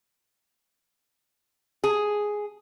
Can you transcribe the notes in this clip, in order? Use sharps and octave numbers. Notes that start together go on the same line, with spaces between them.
G#4